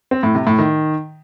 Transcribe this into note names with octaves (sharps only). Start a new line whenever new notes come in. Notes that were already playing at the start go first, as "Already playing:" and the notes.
C4
A2
C3
A2
D#3